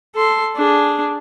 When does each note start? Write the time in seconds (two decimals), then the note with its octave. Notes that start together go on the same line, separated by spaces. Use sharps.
0.15 A4 C6
0.56 D4 G#4